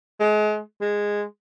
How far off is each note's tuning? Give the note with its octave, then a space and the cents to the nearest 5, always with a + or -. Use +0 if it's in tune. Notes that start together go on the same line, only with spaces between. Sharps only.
G#3 +35
G#3 -10